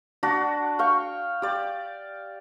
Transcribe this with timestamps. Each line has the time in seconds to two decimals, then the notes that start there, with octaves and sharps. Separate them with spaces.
0.23 D4 F#4
0.79 F5 G5 C#6
1.42 G4 D5